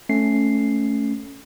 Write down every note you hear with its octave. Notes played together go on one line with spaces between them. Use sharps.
A3 C#4 C7